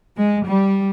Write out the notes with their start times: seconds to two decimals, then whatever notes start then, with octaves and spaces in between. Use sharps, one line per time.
0.16 G#3
0.45 G3